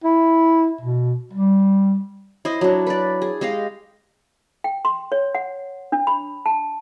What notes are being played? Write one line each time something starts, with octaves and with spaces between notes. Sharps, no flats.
E4
B2
G3
E4 C5 D#5
F#3 D4
B4 D5
G#4
G#3 G4 D#5 F5
G5
C6
C#5
F#5
D4
B5
A5